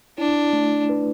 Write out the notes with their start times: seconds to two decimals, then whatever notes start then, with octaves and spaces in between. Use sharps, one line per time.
0.18 D4 E4
0.53 A3
0.89 B4